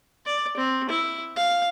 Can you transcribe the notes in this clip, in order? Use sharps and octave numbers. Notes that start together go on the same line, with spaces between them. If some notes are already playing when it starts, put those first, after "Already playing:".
D5
C4
E4
F5